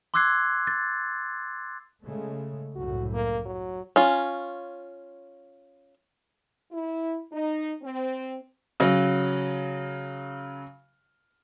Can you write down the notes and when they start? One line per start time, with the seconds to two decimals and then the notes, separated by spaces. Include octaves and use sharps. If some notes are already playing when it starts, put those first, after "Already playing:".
0.14 C6 D6 E6 F#6 G#6 C7
0.67 A6
2.05 C#3 G#3 A3
2.76 C2 F#2 A2 F#4
3.13 A#3
3.45 F#3
3.96 C#4 F4
6.72 E4
7.33 D#4
7.83 C4
8.80 C#3 F#3